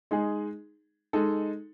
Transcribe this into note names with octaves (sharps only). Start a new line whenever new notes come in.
G#3 D#4 G#4
G#3 D#4 A4